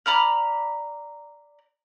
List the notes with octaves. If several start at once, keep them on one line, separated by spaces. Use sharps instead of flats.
D5 A#5 B5 F6